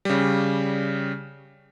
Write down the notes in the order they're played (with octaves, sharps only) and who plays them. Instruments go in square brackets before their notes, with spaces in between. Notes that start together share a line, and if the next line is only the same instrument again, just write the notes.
[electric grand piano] C#3 G3